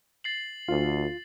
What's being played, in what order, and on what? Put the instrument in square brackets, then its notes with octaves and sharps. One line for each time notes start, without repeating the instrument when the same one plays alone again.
[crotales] A6 C7 F#7
[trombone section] D2 [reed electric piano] F4